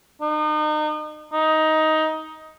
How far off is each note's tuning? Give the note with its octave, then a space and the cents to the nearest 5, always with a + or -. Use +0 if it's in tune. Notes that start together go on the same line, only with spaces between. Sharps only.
D#4 -35
D#4 +15